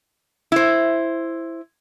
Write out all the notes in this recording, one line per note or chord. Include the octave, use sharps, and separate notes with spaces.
E4 C5